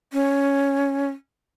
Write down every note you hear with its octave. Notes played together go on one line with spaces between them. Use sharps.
C#4